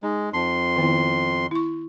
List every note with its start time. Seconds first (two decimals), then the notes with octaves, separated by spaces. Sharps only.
0.03 G#3 D#4
0.33 F2 A5 C6
0.76 D#3 B3 E4
1.51 E4 C#6